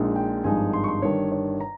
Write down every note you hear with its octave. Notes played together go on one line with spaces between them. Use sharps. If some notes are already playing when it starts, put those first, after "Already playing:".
Already playing: A#1 A#2 G#3 D#4
G5
G#1 G2 F3 G#3 D#4 G#5
C6
C#6
C6
G1 G2 D#3 C#5
C#5
A#5